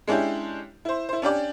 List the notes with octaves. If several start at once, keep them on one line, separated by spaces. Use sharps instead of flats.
G#3 C#4 D4 E4 G4
E4 C5
E4 C5
C#4 D4 G4 D5